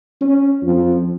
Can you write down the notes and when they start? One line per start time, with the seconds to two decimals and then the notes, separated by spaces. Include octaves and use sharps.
0.21 C#4
0.62 F2